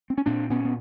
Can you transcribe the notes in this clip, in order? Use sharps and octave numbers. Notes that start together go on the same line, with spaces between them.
C4
C#4
A#2 C4 D4
A#2 B3 C#4
B3